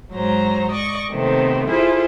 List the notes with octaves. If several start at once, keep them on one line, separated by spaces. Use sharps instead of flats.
G#2 F#3 C5 A#5
D5 D#5 C#6
C3 D#3 A3 B3 C4
E4 F4 G#4 A4 C5